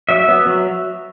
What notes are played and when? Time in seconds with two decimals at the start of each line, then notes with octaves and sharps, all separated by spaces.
0.09 F#3 E5
0.28 B3
0.47 F#3